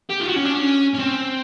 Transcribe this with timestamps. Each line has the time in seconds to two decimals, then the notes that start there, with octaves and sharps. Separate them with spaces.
0.10 G4
0.20 F4
0.28 F#4
0.36 C#4
0.45 D4
0.55 C#4
0.95 C#4
1.00 C4